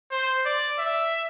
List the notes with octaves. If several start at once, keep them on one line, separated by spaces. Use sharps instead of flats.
C5
D5
E5